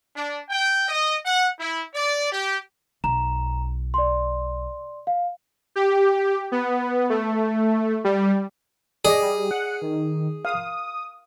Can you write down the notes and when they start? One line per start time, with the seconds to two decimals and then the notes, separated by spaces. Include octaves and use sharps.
0.15 D4
0.49 G5
0.88 D#5
1.25 F#5
1.59 E4
1.94 D5
2.32 G4
3.04 B1 A#5 E7
3.94 D5 C6
5.07 F5
5.76 G4
6.52 B3
7.10 A3
8.04 G3
9.05 G#4 D5 D#5
9.21 G3
9.51 F#5
9.82 D#3
10.45 F5 D#6